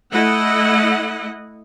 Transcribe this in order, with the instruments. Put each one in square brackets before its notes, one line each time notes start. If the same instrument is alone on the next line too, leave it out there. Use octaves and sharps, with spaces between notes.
[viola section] A3 E4 D#5 F#5